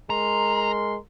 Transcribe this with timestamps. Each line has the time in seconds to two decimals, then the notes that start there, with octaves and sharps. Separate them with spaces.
0.10 G#3 A#4 A#5 C6